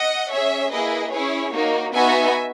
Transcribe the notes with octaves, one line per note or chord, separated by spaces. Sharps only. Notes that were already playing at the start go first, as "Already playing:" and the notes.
Already playing: D#5 F#5
C#4 G#4 C#5 E5
A#3 E4 G#4 B4 D#5
C#4 E4 G#4 C#5
A#3 D#4 F#4
B3 D#4 F#4 E5 G#5